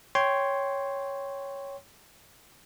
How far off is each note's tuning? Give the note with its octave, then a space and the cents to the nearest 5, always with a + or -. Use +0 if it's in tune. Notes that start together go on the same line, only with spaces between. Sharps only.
C#5 +0 G5 +0 C6 +0